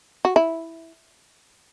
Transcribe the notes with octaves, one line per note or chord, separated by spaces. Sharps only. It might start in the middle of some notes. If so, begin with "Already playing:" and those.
F#4
E4